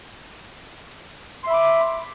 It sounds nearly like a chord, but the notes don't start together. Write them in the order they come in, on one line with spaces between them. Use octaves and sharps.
C6 E5 B5 D6